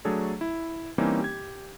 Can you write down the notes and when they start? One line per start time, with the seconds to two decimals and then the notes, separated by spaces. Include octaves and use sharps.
0.05 F#3 A3 D4 G#4 A4 C#5
0.41 E4
0.98 E3 G3 A#3 C4 C#4 D#4
1.20 G4 G#6